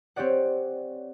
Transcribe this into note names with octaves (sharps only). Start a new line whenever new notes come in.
C4 G4 C#5 D5 F#5